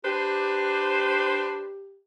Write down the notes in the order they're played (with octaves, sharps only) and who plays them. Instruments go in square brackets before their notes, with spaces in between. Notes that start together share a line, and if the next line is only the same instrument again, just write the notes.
[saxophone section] D4 B4 C5 [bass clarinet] G4